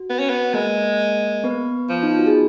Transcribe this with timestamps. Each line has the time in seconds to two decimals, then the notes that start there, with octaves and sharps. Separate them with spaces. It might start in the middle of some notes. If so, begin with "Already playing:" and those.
Already playing: F#4
0.10 B3
0.19 C#4
0.30 B3
0.54 G#3 A#3 A#4
1.44 B3 B4
1.89 F3
2.03 D#4
2.11 F4
2.19 F#4
2.27 G#4